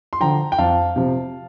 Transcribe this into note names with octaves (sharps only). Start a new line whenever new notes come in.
C6
D3 F3 G5 A#5
G5
F2 F5 A5
C3 F3